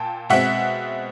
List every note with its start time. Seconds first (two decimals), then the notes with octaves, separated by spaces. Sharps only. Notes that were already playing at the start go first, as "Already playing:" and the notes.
Already playing: A#2 G5 A5
0.30 B2 G#3 C4 E5 F#5